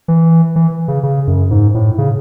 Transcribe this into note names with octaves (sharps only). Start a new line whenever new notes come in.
E3
E3
C#3
C#3
F#2
G#2
A2
C#3